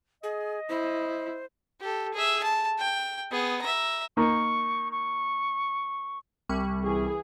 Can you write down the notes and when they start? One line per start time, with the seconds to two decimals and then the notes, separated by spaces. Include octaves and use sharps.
0.23 G#4 D#5
0.69 E4 C5
1.81 G4 A4
2.14 G#4 E5
2.44 A5
2.79 G5
3.31 B3 G#4
3.62 E5 A#5
4.17 A#3 D#4 C#6
4.92 C#6
6.49 C2 G3 C#6
6.85 E3 G#4